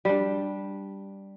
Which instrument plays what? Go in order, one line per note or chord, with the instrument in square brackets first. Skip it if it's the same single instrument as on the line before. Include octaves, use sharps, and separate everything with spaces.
[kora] G3 D4